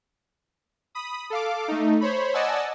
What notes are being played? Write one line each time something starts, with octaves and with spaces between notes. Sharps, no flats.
B5 D#6
A4 F5 D6
A3 D#4
C5 C#5 B5
D5 D#5 F#5 G#5 A5 E6